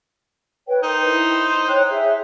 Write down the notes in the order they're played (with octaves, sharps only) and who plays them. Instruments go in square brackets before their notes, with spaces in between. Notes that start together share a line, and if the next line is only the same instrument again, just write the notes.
[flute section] B4 C#5 G5
[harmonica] D#4 C5 [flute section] A#4
[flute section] E4
C#5 G5 F#6
G#4 E5